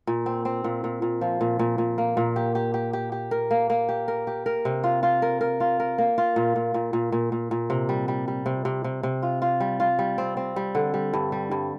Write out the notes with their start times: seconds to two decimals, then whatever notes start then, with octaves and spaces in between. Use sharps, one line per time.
0.07 A#2
0.26 C4
0.45 C4
0.64 A#2
0.84 A#2
1.02 A#2
1.21 F3
1.41 A#2
1.59 A#2
1.78 A#2
1.98 A#3
2.17 A#2
2.36 G4
2.55 G4
2.74 G4
2.93 G4
3.12 G4
3.31 A#4
3.51 A#3
3.70 A#3
3.89 G4
4.08 A#4
4.27 G4
4.46 A#4
4.65 C3
4.84 F4
5.03 F4
5.22 A#4
5.41 A#4
5.60 F4
5.80 A#4
5.98 A#3
6.18 F4
6.36 A#2
6.56 A#2
6.74 A#2
6.93 A#2
7.12 A#2
7.32 A#2
7.51 A#2
7.70 C3
7.89 G3
8.08 G3
8.28 G3
8.46 C3
8.65 C3
8.84 C3
9.03 C3
9.22 F4
9.42 F4
9.60 G3
9.80 F4
9.99 G3
10.18 C4
10.37 C4
10.56 G3
10.75 D3
10.94 G3
11.13 G2
11.32 G3
11.51 G2